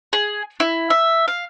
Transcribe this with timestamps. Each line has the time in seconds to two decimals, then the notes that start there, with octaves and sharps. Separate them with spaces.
0.13 G#4
0.60 E4
0.90 E5
1.28 F5